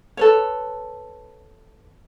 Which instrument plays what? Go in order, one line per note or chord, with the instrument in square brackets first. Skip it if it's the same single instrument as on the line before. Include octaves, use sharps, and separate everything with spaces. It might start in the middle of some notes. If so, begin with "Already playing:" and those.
[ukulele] A4 B4 C#5